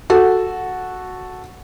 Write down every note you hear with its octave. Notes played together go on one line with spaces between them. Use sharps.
F#4 A4